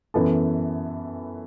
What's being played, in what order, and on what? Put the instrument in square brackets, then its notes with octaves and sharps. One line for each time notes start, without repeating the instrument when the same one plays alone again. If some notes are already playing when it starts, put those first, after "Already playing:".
[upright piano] F#2 E3 B3 A4